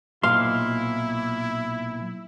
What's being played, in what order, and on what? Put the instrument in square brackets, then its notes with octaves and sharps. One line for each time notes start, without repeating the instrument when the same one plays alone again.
[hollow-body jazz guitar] B1 C6 [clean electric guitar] A#2 [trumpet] E4 [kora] F5